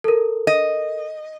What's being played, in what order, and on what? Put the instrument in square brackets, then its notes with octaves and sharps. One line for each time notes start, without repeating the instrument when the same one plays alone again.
[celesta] A4 A#4
[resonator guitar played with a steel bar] D#5